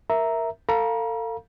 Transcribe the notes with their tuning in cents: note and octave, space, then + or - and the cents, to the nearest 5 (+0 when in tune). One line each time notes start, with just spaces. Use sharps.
A#4 +0 E5 +0 A#5 +0
A4 +35 F5 +0 A#5 +40